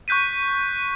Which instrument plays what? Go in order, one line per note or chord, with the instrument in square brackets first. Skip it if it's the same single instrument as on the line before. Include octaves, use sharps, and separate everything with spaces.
[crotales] C#6 F#6 G6 B6 D#7